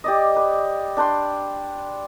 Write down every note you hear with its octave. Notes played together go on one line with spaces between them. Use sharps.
G4 D5 D#5
B4
D4 B4 G5 C6